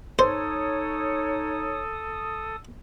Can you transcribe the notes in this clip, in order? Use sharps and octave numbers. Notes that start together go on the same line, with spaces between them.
D#4 A4 C5 C#5 D#6